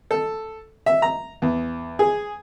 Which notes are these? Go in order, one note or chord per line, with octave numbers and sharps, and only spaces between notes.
A4
E5
A#5
E2
G#4